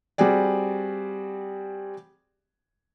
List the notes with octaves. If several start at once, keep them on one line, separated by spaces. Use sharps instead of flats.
G3 C4 F#4 G#4 D5